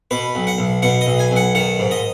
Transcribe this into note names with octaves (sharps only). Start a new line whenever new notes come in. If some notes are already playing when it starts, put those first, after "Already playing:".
B2 B4
B1
F#5
B1
B2 F#5
D#5
B1
G#5
B1
F#5
D#3 F#5
G#2
D#5